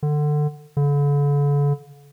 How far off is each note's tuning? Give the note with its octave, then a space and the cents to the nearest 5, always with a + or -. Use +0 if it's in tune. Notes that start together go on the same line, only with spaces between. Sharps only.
D3 +20
D3 -40